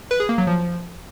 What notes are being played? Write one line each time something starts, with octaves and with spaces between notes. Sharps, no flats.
B4
G#4
A#3
F#3
F3